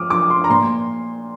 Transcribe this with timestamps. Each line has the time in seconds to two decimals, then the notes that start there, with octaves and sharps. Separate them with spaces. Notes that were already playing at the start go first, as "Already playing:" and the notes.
Already playing: F3 D6 D#6 F6
0.10 F3 D6
0.30 C6
0.44 A#5
0.50 A#2 C6